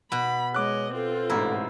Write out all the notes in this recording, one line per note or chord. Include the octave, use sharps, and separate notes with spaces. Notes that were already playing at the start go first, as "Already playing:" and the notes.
B2 B5
G#3 C#5 D#5 D6 F#6
C4 F4 A4
A1 G#2 E4 A#5